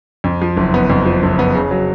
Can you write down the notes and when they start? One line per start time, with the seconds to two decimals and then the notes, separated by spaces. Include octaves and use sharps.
0.24 F2
0.42 F3
0.57 F#1
0.74 B3
0.90 F2
1.05 F3
1.23 F#1
1.39 B3
1.55 C#3
1.71 F#3